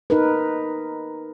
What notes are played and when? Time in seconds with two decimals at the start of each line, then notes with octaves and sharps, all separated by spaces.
0.10 D#4 A#4 B4